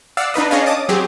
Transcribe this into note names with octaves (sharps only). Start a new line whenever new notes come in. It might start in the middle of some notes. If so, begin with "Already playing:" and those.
D5 F5 F#5 E6
D4 D#4 B4 D#5
C#4 D4 G#4 C#5 D#5 F5
A5 D6 D#6
F#3 C4 G4 G#4